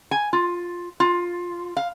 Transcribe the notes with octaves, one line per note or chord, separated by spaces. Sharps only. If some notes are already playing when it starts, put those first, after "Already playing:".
G#5
F4
F4
F5